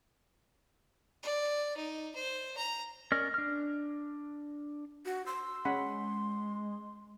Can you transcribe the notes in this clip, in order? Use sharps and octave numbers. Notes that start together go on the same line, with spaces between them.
D5
D#4
C5
A#5
C#4 A#4 D5 D#5 F6
D4 F6
F#4
C6 E6
G#3 C#4 F#5 B5